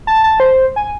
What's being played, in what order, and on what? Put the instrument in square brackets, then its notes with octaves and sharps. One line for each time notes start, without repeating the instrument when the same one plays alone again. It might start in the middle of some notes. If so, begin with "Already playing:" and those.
[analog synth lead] A5
A5
C5
G#5